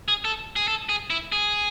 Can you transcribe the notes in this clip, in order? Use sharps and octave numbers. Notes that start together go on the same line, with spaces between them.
G#4
A4
G#4
A4
G#4
E4
G#4